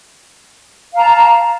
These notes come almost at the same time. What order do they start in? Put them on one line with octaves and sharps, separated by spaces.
F5 A#5 A5